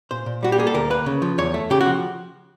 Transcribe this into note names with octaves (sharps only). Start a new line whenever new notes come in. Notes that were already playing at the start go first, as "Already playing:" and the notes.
A#2 C5
A#2
G3 F#4
G4
A#3 G#4
A4
D2 A#4
A#3 B4
C#3
F3
E2 C#5
A3
C#3 G4
F#4
F3